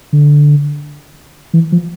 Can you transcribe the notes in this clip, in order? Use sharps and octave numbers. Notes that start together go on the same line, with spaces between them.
D3
E3
F3